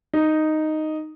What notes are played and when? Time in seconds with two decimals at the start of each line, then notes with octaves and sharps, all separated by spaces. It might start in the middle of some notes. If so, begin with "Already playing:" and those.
0.13 D#4